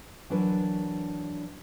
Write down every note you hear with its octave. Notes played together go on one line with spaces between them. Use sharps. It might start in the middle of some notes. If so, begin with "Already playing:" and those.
E3 F#3 D4 A#4 B4